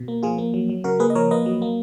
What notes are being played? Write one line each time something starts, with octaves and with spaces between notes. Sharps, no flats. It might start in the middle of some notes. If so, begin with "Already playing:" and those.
Already playing: B2
A#3
F3 F4 G#4
A#3
F#3
F#3
C#3 F#4 A#4
A#3 G#4 B4
D#5
F3 A#4 C#5
A#3 B4 D#5
F#3
A#3